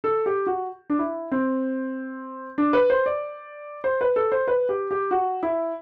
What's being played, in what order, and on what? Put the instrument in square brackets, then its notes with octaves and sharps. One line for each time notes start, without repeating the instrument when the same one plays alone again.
[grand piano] A4
G4
F#4
D4
E4
C4
D4
B4
C5
D5
C5
B4
A4
C5
B4
G4
G4
F#4
E4